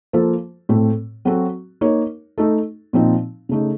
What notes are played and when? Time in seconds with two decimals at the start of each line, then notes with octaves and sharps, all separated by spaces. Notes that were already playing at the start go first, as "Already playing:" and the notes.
0.13 F3 A#3 F4 A4 C5
0.69 A2 A3 C4
1.25 F#3 C4 F#4 A4
1.81 A#3 D#4 A#4 C#5
2.38 A3 D#4 A4
2.93 A#2 F3 C4 D#4
3.49 C#3 A3 D#4